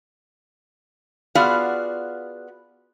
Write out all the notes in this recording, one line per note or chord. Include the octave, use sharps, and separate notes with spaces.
B3 F4 F#4 G#4 D5 F5